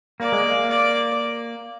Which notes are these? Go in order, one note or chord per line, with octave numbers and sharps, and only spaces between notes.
A#3 D5
G#3
A#3
D5